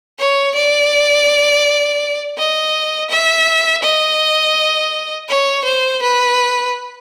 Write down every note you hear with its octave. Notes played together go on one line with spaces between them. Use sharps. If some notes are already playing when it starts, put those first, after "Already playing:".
C#5
D5
D#5
E5
D#5
C#5
C5
B4